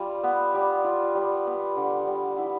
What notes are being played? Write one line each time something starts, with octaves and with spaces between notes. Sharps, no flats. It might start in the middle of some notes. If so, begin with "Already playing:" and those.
Already playing: G3 F4
B3
G3
F4
G3
B3
D3
G3
E4